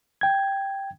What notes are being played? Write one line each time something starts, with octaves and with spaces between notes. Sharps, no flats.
G5 G#6